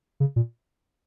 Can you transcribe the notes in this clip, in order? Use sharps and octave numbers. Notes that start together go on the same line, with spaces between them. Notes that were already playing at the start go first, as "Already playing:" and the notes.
C#3
A#2